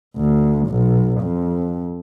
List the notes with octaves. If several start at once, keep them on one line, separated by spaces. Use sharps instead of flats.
D2
B1
F2